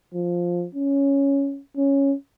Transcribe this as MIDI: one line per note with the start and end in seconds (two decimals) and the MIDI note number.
0.14 0.65 53
0.75 1.60 61
1.77 2.14 61